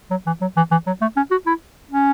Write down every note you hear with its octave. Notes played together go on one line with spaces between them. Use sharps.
F#3
E3
F#3
E3
E3
F#3
A3
C#4
F#4
E4
C#4